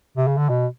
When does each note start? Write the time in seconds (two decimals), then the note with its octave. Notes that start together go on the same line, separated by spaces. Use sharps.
0.17 C3
0.27 C#3
0.37 D3
0.49 B2